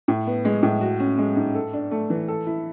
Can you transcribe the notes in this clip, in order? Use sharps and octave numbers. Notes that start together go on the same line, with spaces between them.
A2
B3
G#3
A2
F#4
C#4
G#3
G#2
A4
D4
A3
E3
A4
E4